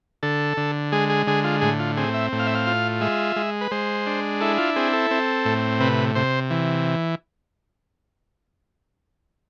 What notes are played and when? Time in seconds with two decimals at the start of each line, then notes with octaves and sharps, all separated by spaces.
0.23 D3 A4
0.57 D3
0.92 G#3 G#4
1.10 G#4
1.27 D3 G#4
1.44 F4
1.61 A2 G#4
1.79 F4
1.97 C4 G#4
2.14 E5
2.32 A2
2.39 F5
2.47 E5
2.55 F5
2.67 F4
3.01 G#3 E5
3.36 G#3
3.61 B4
3.71 G#3 C5
4.07 D4
4.40 E4 A4
4.58 F4
4.76 C4 G#4
4.93 A4
5.11 C4
5.45 A2
5.80 C3 B4
6.15 C3 C5
6.51 E3